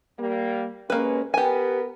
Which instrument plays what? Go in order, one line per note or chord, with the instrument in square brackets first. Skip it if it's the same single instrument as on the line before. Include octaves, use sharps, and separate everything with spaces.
[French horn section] G3 A#3
[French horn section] C3 G#3 C#4 [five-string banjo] A#3 B4
[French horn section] B3 A#4 B4 [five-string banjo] G4 G#5